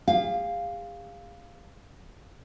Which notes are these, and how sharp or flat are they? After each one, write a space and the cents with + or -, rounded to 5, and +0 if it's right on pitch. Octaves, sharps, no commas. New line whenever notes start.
G#4 -45 F5 +0